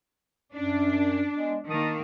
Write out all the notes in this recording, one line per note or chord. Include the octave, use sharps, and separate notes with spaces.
F#2 C#4 D4
G#3 B3
D#3 A#3 A5 D#6